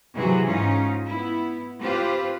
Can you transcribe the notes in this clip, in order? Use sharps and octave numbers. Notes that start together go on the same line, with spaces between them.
C3 E3 F#3 F#4 G#4
G#2 C#4 D#4 F4
B3 E4
C4 F4 G4 B4 C5